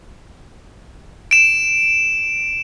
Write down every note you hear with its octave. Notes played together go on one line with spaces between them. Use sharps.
D7 E7